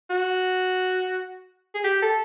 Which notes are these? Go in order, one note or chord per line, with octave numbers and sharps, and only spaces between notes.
F#4
G#4
G4
A4